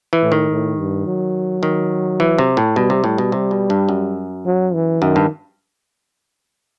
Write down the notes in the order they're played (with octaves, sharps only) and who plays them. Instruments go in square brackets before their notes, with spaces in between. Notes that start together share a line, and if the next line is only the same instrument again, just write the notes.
[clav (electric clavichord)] E3
[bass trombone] A2
[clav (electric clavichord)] D#3
[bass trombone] A2
G2
F#3
[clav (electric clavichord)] D#3
E3
C3
A2
[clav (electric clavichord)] B2 [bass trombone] G3
[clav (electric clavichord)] C3
[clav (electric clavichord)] A2 [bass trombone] G3
[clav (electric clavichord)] B2
C3
B2
G2
F#2
[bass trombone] F#3
E3
[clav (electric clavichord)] F#2 [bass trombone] D#3
[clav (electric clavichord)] G2